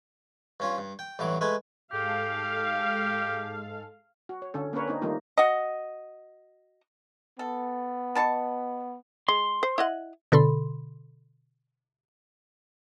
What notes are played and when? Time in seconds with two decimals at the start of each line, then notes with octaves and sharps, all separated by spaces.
0.60 G2 C#4 F4
0.78 G2
0.99 G5
1.19 A1 G2 E3 F#3 D6
1.41 G#3 A3 B4 G#5
1.92 G#2 G#3 G4 A4 F5
4.29 F#4
4.42 C#5
4.54 D3 C#4 A4
4.73 A#3 C#4 D4 A#4 B4 C#5
4.88 C4 D4 D#4
5.02 D#3 G3 A3 A#3 D#4 F4
5.38 F#4 D#5
7.39 B3 A4
8.15 B2 A5 C#6
9.28 G#3 C6
9.63 C5
9.78 E4 D#5 F#5
10.32 B2 D3 A4 B5 C6